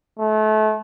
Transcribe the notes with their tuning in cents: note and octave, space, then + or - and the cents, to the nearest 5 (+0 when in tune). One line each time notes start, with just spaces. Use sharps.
A3 -30